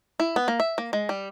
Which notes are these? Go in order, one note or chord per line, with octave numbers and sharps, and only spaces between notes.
E4
B3
A#3
E5
A#3
G#3
G3